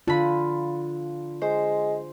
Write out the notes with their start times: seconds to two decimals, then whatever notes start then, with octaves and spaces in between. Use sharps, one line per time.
0.08 D3 F4 B5
1.42 G#3 C5